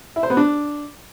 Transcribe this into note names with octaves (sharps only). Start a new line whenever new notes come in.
E4
C5
B3
D4